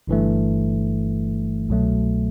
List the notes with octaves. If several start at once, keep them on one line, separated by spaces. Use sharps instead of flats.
G1 G2 E3 A3
C2 B2 F#3 A3